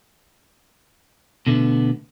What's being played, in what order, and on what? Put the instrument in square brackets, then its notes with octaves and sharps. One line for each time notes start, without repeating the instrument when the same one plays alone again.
[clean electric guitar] B2 D3 A3 B3